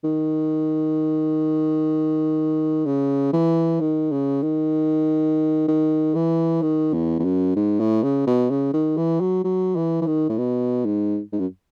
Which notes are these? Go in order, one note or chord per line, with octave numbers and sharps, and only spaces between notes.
D#3
C#3
E3
D#3
C#3
D#3
D#3
E3
D#3
E2
E2
F#2
G#2
A2
C#3
B2
C#3
D#3
E3
F#3
F#3
E3
E3
D#3
A2
B2
G#2
G#2
F#2